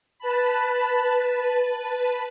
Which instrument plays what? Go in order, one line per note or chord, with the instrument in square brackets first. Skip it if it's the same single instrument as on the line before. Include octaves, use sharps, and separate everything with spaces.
[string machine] B4 A5 B5